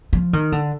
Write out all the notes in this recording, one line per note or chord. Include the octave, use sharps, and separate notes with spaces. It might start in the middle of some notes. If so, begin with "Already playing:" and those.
F3
D#3
D3